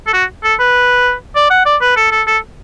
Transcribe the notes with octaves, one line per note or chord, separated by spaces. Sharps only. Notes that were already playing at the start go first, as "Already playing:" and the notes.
A4
F#4
A4
B4
D5
F#5
D5
B4
A4
A4
A4